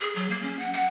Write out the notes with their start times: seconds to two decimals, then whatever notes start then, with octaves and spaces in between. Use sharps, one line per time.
0.01 G#4
0.16 F#3
0.30 A#3
0.42 C#4
0.59 F#5
0.73 F#5